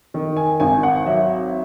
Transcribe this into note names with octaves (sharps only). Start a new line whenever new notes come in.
D#3
G#5
G#1 G#5
F#5
F#3 E5